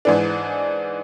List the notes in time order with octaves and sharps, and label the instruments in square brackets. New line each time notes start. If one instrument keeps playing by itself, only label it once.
[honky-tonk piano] G#2 E3 D4